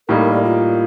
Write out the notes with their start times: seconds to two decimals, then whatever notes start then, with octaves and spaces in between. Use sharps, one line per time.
0.08 A2 G3 A#3 D#4 A#4
0.21 A#4
0.32 D5
0.44 F4